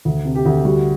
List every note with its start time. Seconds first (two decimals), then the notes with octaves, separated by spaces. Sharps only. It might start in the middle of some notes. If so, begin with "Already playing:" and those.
0.05 D2
0.25 C3
0.35 G4
0.46 D2
0.65 G3 F#4